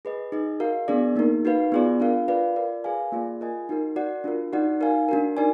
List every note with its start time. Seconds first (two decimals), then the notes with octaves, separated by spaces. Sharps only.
0.05 G#4 B4 D#5
0.32 D#4 G#4 D#5
0.60 F#4 A#4 F5
0.88 B3 D4 G#4 D5
1.16 A#3 D#4 A#4
1.45 D#4 F#4 B4 F5
1.72 B3 F4 G#4 D5
2.00 D4 F4 A#4 F5
2.28 F4 B4 D5 F5
2.56 F4 A#4 D5
2.84 G#4 B4 F5 G#5
3.12 A#3 F4 G#4 D5
3.41 F4 A#4 D#5 G#5
3.69 D#4 F#4 A#4
3.96 F#4 D5 F#5
4.24 D4 F4 A#4
4.53 D#4 F#4 D5 F#5
4.81 D#4 A#4 F5 G#5
5.09 D4 F#4 A#4
5.37 D#4 A#4 D5 G#5